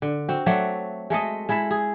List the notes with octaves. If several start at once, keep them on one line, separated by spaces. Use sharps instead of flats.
D3
C4 F#4
F#3 A3 F#4 D5
G#3 A3 A4 D#5
G#3 E4 A4 E5
G#4